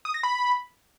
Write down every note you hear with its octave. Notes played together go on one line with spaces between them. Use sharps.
D#6
A#6
B5